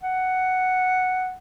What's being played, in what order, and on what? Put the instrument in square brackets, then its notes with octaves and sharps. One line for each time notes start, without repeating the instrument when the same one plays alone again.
[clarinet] F#5